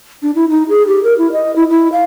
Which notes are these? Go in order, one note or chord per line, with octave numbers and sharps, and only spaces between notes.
D4
E4
D#4
G#4
G4
A#4
E4
D#5
E4
E4
F5